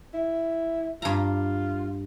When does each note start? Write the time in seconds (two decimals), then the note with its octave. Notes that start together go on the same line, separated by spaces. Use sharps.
0.14 E4
1.02 G2 F4 A#5